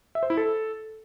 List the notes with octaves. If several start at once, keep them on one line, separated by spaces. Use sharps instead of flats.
E5
C5
E4
A4